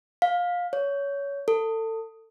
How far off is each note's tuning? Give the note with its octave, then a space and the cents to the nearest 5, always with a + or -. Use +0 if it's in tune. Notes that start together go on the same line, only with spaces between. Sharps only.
F5 +20
C#5 +20
A4 +25